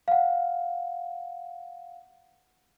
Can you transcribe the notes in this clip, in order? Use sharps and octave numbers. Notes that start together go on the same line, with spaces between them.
F5 F#5